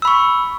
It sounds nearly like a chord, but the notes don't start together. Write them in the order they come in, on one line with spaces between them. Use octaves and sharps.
E6 B5 C#6